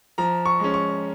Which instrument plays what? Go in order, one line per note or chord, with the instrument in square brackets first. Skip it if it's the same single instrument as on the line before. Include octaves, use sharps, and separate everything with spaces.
[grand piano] F3 A#5
C#6
G#3 C#4
C#6